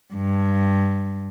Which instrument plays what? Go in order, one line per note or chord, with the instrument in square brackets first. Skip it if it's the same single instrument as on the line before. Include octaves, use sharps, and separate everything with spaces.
[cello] G2